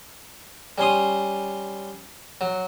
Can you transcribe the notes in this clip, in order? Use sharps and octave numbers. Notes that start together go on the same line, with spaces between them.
G3 C#4 C6 D#6
F#3